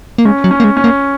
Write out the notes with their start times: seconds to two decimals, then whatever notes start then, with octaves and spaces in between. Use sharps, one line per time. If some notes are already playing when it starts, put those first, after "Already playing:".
0.18 A#3
0.25 G#3 C#4
0.44 F#3
0.51 C#4
0.60 A#3
0.64 G#3
0.77 C#4
0.84 A#3